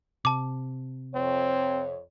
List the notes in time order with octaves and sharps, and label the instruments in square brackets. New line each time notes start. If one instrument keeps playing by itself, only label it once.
[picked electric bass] C3 [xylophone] A5 D6
[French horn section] F2 C#5 [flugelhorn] C4